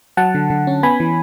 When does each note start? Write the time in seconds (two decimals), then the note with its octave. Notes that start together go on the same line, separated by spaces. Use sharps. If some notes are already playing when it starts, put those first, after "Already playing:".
0.17 F#3 F#5 A5
0.35 D3
0.50 D3
0.67 C#4
0.83 B3 G#5 B5
1.00 E3